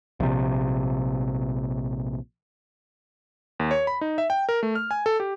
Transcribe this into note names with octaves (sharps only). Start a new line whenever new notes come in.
A#1 C3
D#2
C#5
B5
D#4
E5
G5
A#4
A3
F6
G#5
A4
G4